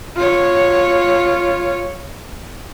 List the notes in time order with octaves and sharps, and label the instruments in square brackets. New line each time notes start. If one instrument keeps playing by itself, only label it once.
[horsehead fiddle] F4 C#5